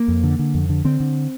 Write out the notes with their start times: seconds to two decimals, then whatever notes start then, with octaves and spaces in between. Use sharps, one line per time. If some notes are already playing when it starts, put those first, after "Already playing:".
Already playing: A#3
0.08 F2
0.23 D3
0.39 D3
0.54 F2
0.70 D3
0.84 D3 C4
1.00 D3